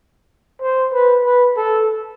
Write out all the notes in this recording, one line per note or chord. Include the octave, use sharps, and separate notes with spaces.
C5
B4
B4
A4